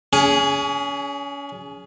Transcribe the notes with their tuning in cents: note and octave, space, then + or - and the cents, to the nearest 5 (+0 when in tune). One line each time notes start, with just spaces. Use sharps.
C#4 +35 G#4 +0